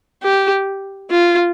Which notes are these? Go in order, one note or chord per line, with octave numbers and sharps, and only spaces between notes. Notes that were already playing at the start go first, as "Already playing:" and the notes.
G4
F4